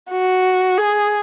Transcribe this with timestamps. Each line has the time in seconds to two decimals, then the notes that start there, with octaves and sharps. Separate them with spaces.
0.11 F#4
0.78 G#4